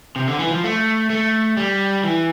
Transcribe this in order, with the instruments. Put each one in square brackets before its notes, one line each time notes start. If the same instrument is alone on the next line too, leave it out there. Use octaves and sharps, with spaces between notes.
[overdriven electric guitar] C3
D3
E3
F3
A3
A3
G3
E3